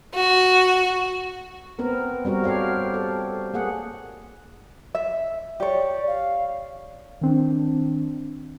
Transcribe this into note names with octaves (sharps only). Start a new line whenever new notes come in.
F#4
B3 C4 A#4
G3 C4 F#4 A#4
G4 A4 C#5 F5
A4
A#3 G#4 F#5
E5
G4 C#5 D5
F5
D#3 C4 D4